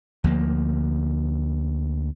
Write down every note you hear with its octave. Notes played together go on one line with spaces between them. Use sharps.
D2 F3 A#3